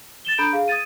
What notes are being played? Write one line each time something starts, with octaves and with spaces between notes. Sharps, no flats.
A6 E7 G7
D4 A4 A#5 B5 G6 D7
G#4 F5
D#6 G#6 A6 D#7